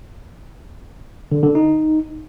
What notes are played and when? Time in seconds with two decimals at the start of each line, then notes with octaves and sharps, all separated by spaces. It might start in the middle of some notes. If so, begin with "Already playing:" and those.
1.32 D3
1.43 D3
1.55 D#4